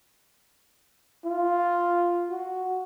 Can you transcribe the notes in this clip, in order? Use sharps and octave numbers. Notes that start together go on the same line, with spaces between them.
F4
F#4